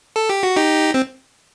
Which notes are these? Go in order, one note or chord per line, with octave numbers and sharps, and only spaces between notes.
A4
G4
F#4
D#4 G4
C4